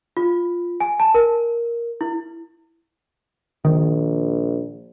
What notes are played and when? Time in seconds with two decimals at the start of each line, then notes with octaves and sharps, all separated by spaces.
0.17 F4
0.80 G#5
1.00 A5
1.14 A#4
2.01 E4
3.65 A#1 D#3